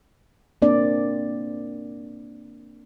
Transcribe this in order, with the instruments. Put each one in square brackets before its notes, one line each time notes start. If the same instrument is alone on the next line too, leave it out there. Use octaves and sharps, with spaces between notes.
[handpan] A#3 C4 D4 D5